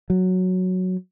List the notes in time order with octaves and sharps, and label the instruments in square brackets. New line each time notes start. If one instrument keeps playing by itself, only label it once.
[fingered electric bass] F#3